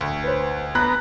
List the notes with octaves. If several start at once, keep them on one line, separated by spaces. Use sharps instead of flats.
D2
B4 C5
B3 A#5 F#6